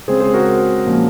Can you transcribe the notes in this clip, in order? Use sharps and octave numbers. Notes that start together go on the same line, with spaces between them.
C#3 G#3 C4 G#4 C5
G#4 C5
F#4 A#4
A#2 F3 A#3 C#4